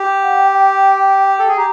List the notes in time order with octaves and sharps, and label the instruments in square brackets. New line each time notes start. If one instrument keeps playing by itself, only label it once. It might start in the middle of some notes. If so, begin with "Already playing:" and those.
Already playing: [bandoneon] G4
[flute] F#5
G5
G5
[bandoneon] A4
G#4
[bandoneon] G4 [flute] A#5